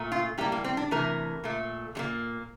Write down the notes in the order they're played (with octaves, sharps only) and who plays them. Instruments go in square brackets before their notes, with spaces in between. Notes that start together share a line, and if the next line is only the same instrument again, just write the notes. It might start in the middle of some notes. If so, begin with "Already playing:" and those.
Already playing: [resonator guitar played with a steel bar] A#2 A3
F4
A2 G3 A#3 G4
A#3
C4
D4
C3 E3 A3 A#4
A#2 A3
A#2 G3 A#3